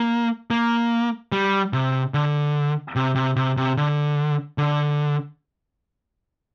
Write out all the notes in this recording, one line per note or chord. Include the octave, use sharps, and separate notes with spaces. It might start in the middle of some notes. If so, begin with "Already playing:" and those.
Already playing: A#3
A#3
G3
C3
D3
C3
C3
C3
C3
D3
D3